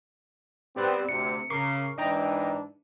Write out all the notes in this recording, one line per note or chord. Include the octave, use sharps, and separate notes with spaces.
B3 C4 G4 D5 F#6
D2 C3 C#7
C#3 A#4 C#6 D6 C7
G#2 E3 D4 D#5 G5 A#5